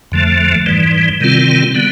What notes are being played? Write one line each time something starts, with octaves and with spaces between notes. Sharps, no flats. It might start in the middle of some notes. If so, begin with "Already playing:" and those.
F2 D3 F3 A3
G#2 E3 G3
C3 D#3 G3 C4 F4
D3 G3 B3